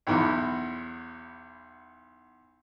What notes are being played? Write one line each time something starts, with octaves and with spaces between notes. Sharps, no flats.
B1 E2